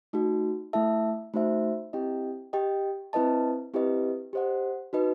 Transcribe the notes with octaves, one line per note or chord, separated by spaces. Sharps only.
A3 D#4 F#4
A3 E4 A4 E5 A5
A3 D#4 F#4 C5 E5
C4 E4 G4 D#5 G5
G4 D#5 G5
C4 E4 B4 D#5 A5
C4 E4 G4 B4 D#5
G4 C5 D#5 F#5
D#4 F#4 B4 D#5